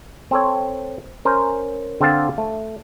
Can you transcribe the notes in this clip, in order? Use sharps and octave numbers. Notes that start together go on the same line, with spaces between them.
C4 A4 C#5
C#4 A#4 C5
D3 C4 D4 A4 F5 A5
A3